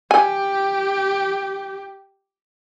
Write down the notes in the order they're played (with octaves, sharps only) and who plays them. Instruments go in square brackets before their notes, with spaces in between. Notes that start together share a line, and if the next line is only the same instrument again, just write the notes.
[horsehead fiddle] G4 [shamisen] G#5